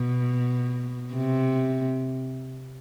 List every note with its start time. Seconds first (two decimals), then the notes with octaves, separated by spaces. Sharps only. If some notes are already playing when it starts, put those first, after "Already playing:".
Already playing: B2
1.14 C3